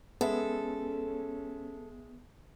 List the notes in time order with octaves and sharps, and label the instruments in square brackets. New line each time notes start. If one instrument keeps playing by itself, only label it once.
[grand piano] G#3 E5 [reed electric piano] B3 [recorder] C#4 [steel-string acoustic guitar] A4